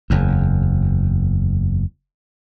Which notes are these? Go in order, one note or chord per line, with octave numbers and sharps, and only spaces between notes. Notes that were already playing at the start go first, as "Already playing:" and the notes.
F#1 E2